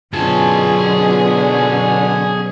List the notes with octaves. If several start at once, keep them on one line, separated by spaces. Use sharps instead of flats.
B2 D3 F#3 C#4 F4 G#4 A5